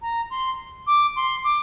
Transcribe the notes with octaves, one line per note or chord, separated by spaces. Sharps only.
A#5
C6
D6
C6
D6